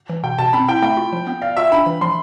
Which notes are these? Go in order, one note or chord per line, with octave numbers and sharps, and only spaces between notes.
E3
B2 G5
B2 A5
C4 B5
E4 G5
A3 G5
F4
F3
B3
D5 F5
F4 E5
D4 B5
E3
F3 C6